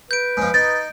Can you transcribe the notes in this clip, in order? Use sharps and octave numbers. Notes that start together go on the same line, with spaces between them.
B4 G6 D7
G#2 F3
D#4 A6